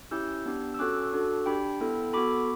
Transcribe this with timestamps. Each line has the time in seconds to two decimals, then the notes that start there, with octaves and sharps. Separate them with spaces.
0.11 C#4 E4 G4 E6 G6
0.46 B3 D4 G4
0.74 E6
0.79 C#4 F#4 A4 D6 F#6
1.13 D4 F#4 A4
1.46 D4 G4 G5 B5
1.80 B3 E4 A4
2.13 B3 F#4 A4 B5 D6